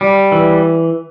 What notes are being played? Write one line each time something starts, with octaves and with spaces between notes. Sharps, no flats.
G3
E3